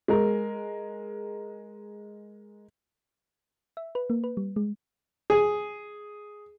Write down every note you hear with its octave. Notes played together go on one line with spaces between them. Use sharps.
G#3 A#4
E5
B4
A#3
B4
G3
G#3
G#4